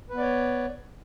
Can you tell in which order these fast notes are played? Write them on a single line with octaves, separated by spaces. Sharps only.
B4 B3 D5 C#5